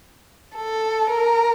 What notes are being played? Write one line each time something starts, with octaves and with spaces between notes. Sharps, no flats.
A4
A#4